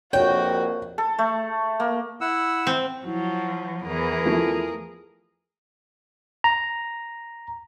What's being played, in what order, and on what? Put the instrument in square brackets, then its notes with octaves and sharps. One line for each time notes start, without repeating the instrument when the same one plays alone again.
[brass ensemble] A#1 F2 [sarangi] F#4 [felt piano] C#5 [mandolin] G5
[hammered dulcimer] A4
A3
A#3
[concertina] E4 F#5 E6
[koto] C4
[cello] F3 [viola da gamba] F#3 [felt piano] E4
[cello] E2 E3 [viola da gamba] G#4 A#4
[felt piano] F3 A3 E4
[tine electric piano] A#5